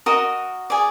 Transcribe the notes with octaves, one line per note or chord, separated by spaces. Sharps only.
F#4 A#4 D#5 D#6
G#4 D5